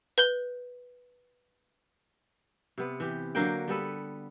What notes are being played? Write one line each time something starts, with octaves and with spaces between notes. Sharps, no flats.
B4 G6 G7
C3 B3
E3 G4
D3 F#3 A#3 G5
G3 B3 A4 B4